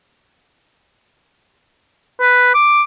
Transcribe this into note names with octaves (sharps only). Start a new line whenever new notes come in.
B4
D6